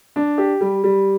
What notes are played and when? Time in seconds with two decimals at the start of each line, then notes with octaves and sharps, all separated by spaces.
0.16 D4
0.38 G4
0.61 G3
0.84 G3